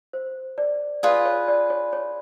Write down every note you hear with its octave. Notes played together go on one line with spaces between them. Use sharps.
C5
D5
F4 G#4 B4 D5
C#5
D5
C#5
C#5